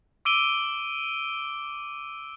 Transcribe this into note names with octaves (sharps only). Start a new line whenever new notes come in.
D6 E6 D7 D#7 G7